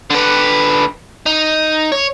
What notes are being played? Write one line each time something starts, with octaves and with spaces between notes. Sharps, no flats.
D3 B4
D#4
C#5